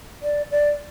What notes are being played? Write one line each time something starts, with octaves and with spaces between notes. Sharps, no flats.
D5
D5